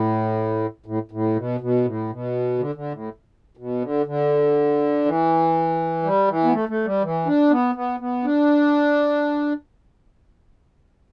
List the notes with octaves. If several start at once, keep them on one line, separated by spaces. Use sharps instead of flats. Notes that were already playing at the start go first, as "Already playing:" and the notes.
Already playing: A2
A2
A2
B2
B2
A2
B2
D3
D3
A2
B2
D3
D3
E3
G3
E3
B3
A3
A3
G3
E3
D4
B3
B3
B3
D4